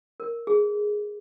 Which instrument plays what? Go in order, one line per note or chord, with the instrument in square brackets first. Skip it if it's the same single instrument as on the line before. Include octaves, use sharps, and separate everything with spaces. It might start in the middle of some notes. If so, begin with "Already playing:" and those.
[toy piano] A#4
G#4